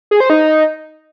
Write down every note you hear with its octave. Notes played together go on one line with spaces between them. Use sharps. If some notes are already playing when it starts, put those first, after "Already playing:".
G#4
C5
D#4